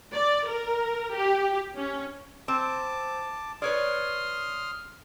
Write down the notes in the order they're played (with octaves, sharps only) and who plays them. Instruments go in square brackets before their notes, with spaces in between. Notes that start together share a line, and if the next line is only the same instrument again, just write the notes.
[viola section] D5
A#4
G4
C#4
[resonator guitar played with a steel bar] C4 [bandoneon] A5 D6
[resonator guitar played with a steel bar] B4 C#5 D5 [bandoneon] C6 D#6 F6